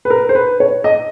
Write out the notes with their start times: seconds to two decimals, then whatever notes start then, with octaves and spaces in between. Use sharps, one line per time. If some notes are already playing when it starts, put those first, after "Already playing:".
0.05 B4
0.10 A#4
0.29 C5
0.35 B4
0.60 C#5
0.84 D#5